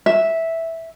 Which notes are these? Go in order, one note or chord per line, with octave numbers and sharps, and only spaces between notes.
E5